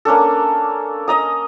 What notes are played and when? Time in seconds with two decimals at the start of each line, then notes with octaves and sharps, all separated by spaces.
0.05 A#3 C#4 D4 A4
1.08 D#5 A#5 D#6